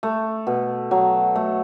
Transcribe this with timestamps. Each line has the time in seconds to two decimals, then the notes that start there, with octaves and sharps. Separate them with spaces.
0.03 A3
0.47 B2
0.91 F#3
1.36 A3